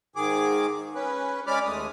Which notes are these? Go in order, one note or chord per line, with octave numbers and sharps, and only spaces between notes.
G#2 D#3 G#4 D6
C#4 B4
G#3 C#4 D5 B5 D6 F6
D#2 G#3 A3 D#6